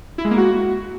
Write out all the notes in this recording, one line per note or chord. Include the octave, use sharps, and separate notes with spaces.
E4
G#3
A#3
F#4